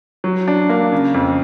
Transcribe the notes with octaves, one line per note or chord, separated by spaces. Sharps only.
F#3
D4
A#3
C#3
F2